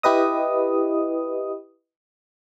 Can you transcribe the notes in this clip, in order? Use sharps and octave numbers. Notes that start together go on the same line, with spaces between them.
E4 G4 B4 D#5 D#6